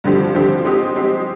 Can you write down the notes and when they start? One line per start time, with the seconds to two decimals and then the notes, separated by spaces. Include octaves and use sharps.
0.04 G2 D3 F3 C4 G4
0.34 G2 D3 F3 C4 G4
0.65 G#3 C4 D#4 G4
0.96 G#3 C4 D#4 G4